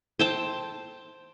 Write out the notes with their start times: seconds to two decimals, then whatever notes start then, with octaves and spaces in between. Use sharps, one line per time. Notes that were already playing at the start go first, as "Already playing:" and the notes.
0.19 C5 G5 A5